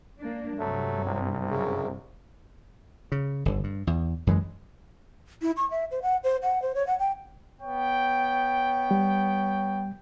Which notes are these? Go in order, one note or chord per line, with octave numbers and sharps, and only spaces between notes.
A#3 D4
G2 C3 F#3 A3
C2
F#2 C#3
C#3
G1 D3
G2
E2
F#2 E3 G#3
E4
C#6
E5
C5
F#5
C5
F#5
C5
C#5
F#5
G5
B3 C#5 G5
G3